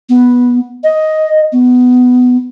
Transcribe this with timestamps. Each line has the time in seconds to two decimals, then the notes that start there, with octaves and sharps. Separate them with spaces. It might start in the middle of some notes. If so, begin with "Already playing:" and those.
0.09 B3
0.84 D#5
1.53 B3